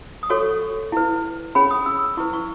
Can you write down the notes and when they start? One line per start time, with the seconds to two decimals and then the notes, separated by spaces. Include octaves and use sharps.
0.23 D#6
0.30 F#4 A4 C#5 C#6
0.92 E4 B4
1.55 C#4 G#4 C#5 B5
1.71 D#6
1.86 E6
2.17 E4 B4 C#6
2.33 C#6